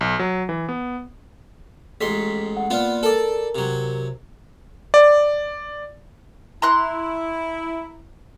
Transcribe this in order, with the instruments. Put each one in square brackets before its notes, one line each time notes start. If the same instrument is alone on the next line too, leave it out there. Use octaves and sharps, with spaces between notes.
[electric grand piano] B1
F#3
E3
B3
[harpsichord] A1 G#2 C6 [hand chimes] B6
[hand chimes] F#5
[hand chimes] A#3 D5 F6 [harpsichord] B3 F4
[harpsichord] A4 D5 [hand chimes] A#4
[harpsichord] C3 F#3
[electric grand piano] D5
[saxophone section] E4 [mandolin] A#5 C6 F#6